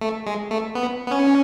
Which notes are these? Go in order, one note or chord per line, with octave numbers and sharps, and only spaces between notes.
A3
G#3
A3
B3
B3
C#4